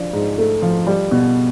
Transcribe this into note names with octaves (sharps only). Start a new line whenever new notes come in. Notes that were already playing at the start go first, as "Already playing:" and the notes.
Already playing: F3 D4
G#2
A3
F3
G3
B2